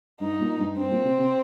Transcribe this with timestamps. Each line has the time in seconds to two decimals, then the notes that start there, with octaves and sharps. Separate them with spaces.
0.21 G2 D#4
0.41 A#2
0.59 G2
0.77 G2 C4
0.91 A#2
1.05 C3
1.20 C3